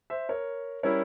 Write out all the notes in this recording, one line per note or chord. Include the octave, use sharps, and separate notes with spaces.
C5 E5
A#4 C#5
G3 C#4 E4 A#4 C#5